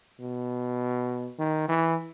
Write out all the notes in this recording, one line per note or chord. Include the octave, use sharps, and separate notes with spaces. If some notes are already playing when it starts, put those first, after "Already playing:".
B2
D#3
E3